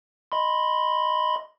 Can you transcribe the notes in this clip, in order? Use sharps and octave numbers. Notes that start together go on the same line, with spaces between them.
D#5 B5 C6